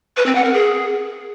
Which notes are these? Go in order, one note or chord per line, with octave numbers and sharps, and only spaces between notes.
B4
C4
F#5
A#4
G#4